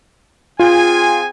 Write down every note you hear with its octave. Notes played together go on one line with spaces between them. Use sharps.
C4 F4 G#4 G#5